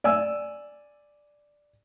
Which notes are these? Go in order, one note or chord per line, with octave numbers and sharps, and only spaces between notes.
D5 G#5 E6